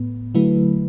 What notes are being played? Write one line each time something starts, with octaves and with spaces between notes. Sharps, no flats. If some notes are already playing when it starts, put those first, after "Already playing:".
Already playing: A2 B3
D3 F#3 A3 E4 B4